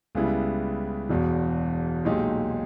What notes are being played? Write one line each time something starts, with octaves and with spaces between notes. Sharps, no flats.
C#2 C#3 G3 B3 E4
E1 E2 B2
B1 A#2 G#3 D#4 G4